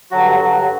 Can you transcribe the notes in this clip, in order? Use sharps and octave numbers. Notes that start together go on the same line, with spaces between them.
G2 D3 F#3 F#4
G2 D3 F#3